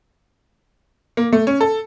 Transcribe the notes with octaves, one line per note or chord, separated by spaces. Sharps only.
A#3
A3
C#4
A4